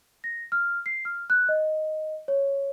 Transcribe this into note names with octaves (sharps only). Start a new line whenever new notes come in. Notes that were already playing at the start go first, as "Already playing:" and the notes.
A#6
F6
C7
F6
F#6
D#5
C#5